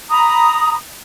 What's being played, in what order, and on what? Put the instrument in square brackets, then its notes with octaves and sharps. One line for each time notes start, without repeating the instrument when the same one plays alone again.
[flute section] A#5 B5 D#6